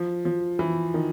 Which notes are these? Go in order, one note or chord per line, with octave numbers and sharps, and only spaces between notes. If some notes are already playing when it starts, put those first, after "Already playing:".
Already playing: F3
F3
E3
D#3